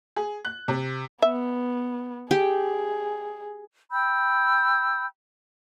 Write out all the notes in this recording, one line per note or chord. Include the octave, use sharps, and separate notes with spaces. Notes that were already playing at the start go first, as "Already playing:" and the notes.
G#4
F#6
C3
B3 E5
G4 G#4
G5 B5 E6 G6